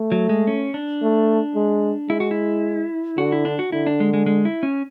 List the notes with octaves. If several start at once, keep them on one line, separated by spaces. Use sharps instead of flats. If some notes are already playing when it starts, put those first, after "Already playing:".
Already playing: A3
F#3
G#3
C#4
D4
A3
G#3
G#3 E4
F#4
E4
D3 F#4
E4
D4
F#4
D3 E4
D4
G#3
G#3
G#3
E4
C#4